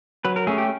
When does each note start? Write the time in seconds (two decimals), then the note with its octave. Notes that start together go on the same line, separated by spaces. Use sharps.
0.25 F#3 B4
0.36 A#4
0.47 A3 C#4 G#4
0.58 G4